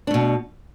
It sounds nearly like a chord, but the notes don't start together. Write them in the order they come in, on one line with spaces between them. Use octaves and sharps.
D4 A3 B2